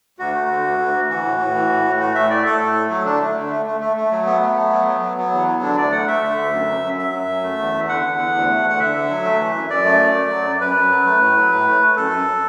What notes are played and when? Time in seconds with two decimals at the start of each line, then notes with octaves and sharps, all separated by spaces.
0.19 D2 F#4
0.34 A3
0.50 D3
0.64 D2
0.79 D2
0.94 D2
1.09 E3 F#4
1.25 A2
1.40 A2
1.55 E3
1.70 A2
1.85 A2
1.99 A3 F#4
2.15 A2 E5
2.30 A3 D5
2.45 A3 A4
2.60 A2
2.75 A3
2.90 F#3
3.05 D3 D4
3.21 A3
3.36 D3
3.51 A3
3.66 A3
3.81 A3
3.97 A3
4.11 F#3
4.26 A3 B3
4.42 A3
4.56 A3
4.72 F#3
4.87 F#3
5.02 F#3
5.17 F#3 B3
5.32 E2
5.47 F#3
5.62 D3 D4
5.77 D2 D5
5.92 A3 F#5
6.07 A3 E5
6.23 D3
6.38 D2
6.52 F#2
6.68 F#2
6.83 F#2
6.99 F#3 E5
7.13 F#2
7.28 F#2
7.43 A3
7.59 E2
7.74 E2
7.89 D3 F#5
8.03 E2
8.19 E2
8.35 D2
8.50 A3
8.65 D2
8.70 F#5
8.80 D3 E5
8.94 D3
9.10 F#3
9.25 A3
9.39 E3
9.55 F#2
9.70 F#2 D5
9.85 A3
10.01 F#2
10.16 A3
10.30 F#3
10.45 F#2
10.60 F#2 B4
10.76 F#2
10.91 F#3
11.06 A3
11.20 A2
11.36 F#3
11.52 A2
11.67 A3
11.81 A3
11.97 F#2 A4
12.11 F#2